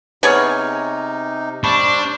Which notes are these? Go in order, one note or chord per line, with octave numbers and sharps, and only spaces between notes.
C3 B3 D#4 G#4 C#5 G#5 F6
G3 D4 C5 B5 C#6